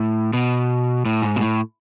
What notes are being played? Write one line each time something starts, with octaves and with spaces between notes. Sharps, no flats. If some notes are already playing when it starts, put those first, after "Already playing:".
Already playing: A2
B2
A2
G#2
B2
A2